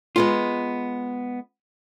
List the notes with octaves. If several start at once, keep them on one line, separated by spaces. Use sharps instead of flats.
G#3 B3 F4